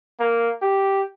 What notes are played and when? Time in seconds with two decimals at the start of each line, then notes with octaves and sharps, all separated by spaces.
0.20 A#3
0.62 G4